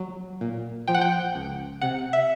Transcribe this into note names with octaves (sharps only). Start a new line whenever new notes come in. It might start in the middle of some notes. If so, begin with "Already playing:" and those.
Already playing: F#3
A#2
F3 G5
F#5
G5
C#2
C3 F#5
E5